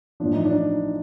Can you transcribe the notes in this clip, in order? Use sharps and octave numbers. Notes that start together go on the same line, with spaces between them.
A1 A2 F3 D4
D#4
D4